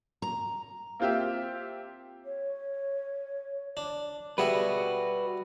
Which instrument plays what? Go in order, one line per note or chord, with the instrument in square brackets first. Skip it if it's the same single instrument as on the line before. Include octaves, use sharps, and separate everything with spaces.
[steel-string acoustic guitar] A#5
[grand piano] A#3 C4 F4 G4 E5
[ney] C#5
[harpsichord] D4
[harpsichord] G3 G#4 E5 [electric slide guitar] F#4 B4